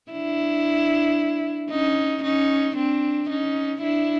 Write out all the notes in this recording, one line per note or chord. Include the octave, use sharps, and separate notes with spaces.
D4 E4
C#4 D#4
C#4 D#4
C4 D4
C#4 D#4
D4 E4